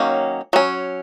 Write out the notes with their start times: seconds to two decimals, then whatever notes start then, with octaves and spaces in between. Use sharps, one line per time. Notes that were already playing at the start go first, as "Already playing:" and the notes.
Already playing: D#3 F#3 A#3 C#4
0.53 F#3 C#4